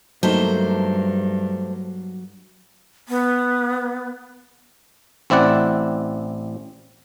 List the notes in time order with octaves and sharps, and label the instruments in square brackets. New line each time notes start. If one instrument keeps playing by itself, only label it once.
[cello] G2 [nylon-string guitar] F#3 A#3 D#4 [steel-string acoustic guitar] A3 C5
[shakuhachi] B3
[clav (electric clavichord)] A1 C4 E4 D5 F#5